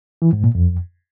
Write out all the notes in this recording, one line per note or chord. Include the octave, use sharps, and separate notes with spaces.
E3
G#2
A#2
F2